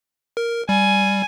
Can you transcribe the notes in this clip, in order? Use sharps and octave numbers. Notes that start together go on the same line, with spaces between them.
A#4
G3 G#5